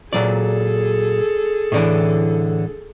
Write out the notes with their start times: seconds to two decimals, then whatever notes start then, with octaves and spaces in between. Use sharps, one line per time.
0.13 A#2 F#3 G#4 A4 D5
1.72 A2 D3 E3